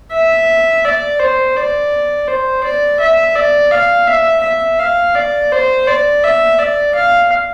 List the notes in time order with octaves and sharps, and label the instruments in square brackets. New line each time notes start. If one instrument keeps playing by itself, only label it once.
[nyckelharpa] E5
D5
C5
D5
C5
D5
E5
D5
F5
E5
E5
F5
D5
C5
D5
E5
D5
F5